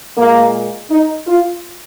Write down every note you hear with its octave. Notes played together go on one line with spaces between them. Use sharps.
A#2 G#3 A#3
D#4
F4